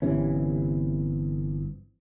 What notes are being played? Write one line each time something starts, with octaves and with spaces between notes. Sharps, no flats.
G1 C3 E3 C#4